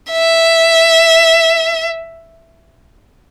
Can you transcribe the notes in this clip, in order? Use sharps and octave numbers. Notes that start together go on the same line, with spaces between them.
E5